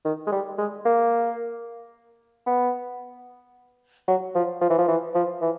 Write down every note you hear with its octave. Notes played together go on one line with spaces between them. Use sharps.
D#3
G#3
G3
G#3
A#3
B3
F#3
F3
F3
E3
F3
E3
F3
E3